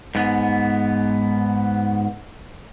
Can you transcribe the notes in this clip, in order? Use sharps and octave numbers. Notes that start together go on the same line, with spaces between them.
G#2 B3